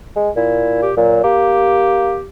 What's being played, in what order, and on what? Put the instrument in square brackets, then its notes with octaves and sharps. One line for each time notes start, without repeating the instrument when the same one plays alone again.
[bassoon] G#3
[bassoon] A#2 [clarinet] E4
[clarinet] G4
[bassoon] A#2 [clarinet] F#3
[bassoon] A#3 [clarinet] G4